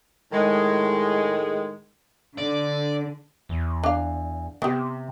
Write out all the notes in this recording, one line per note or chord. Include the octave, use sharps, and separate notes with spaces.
A2 D#3 G#3
D3 D5
E2
D4 F5
C3 B3 G4